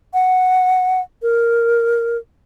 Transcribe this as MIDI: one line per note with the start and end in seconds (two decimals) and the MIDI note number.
0.14 1.01 78
1.22 2.17 70